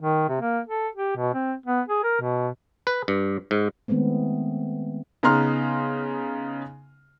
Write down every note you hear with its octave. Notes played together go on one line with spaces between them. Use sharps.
D#3
C3
A#3
A4
G4
B2
C4
B3
G#4
A#4
B2
B4
G2
G#2
D#3 G#3 A3 B3 C4
C#3 B3 D#4 A#5 C6 F6